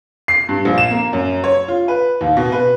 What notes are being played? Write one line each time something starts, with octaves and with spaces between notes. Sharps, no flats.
C7
G2
A#1
E7
A#3
F#2
C#5
F4
B4
D#2
B2
B4